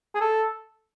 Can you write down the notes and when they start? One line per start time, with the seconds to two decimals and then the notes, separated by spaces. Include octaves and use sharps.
0.15 G#4
0.21 A4